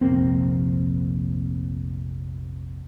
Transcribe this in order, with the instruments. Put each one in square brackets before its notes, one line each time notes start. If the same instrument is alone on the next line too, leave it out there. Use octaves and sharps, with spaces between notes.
[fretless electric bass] F1 A#1 A#3 C4